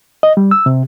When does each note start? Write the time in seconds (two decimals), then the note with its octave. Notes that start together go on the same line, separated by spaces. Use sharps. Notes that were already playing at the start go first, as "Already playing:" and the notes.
0.23 D#5
0.37 G3
0.51 E6
0.66 C3